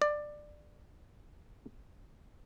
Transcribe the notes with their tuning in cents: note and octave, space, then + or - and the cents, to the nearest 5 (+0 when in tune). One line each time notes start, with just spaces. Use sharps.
D5 +15